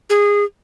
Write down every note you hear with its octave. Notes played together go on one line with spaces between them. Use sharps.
G#4